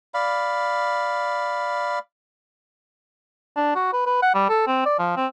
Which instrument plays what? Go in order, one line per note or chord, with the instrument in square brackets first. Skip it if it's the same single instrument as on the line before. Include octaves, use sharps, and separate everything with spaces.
[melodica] D5 F5 B5
[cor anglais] D4
F#4
B4
B4
F#5
G3
A4
C4
D5
F3
C4